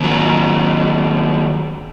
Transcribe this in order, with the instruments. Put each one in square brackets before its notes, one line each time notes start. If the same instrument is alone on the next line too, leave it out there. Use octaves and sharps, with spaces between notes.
[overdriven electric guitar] D#2 F#3